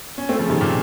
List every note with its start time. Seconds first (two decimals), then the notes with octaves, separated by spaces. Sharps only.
0.18 C#4
0.29 A3 C4
0.39 C#3 F3
0.50 C3 D#3
0.61 A#2 C#3